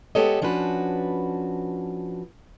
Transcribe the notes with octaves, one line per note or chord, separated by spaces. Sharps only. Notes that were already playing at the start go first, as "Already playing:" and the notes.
G#3 B3 G4 A4 C#5 D#5
F3 C#4 D4 F#4 B4